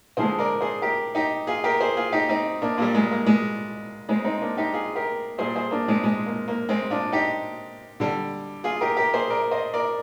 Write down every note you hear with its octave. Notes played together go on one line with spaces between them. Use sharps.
D3 F3 G#3 G#4 C5
A#4 D5
G#4 C5
G4 A#4
D#4 G4
F4 G#4
G4 A#4
G#4 C5
F4 G#4
D#4 G4
C4 D#4
A#3 D4
A#2 G3 A#3
G#3
A#3
G#3
G#3 C4
C4 D#4
A#3 D4
D#4 G4
F4 G#4
G4 A#4
A#2 G3 G#4 C5
G#4 C5
A#3 D4
G#3 C4
G#3
A#3
A#3
G#3 C4
D4 F4
D#4 G4
D3 G3
F4 G#4
G4 A#4
G4 A#4
G#4 C5
A#4 D5
C5 D#5
A#4 D5